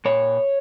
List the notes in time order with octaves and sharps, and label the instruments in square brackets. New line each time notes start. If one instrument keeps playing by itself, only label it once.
[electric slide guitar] A#2 C#5